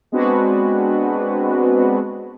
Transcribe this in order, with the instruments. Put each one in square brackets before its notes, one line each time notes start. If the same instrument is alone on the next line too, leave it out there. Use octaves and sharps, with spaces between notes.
[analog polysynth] G#3 B3 C4 D4 F#4 B4